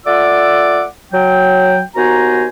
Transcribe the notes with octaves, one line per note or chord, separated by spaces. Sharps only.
A3 F4 D5 F#5 D6 E6
F#3 G5
D#2 B3 F#4 C5 G#5 A#5